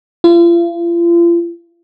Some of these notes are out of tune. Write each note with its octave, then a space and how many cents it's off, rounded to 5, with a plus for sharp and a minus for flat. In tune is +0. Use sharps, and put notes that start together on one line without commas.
F4 -40